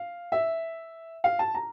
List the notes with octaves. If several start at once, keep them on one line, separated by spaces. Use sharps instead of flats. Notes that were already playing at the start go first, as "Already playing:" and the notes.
Already playing: F5
E5
F5
A5
A#5